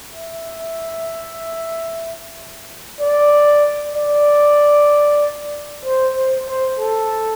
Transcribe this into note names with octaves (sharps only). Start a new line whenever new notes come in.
E5
D5
D5
C5
C5
C5
A4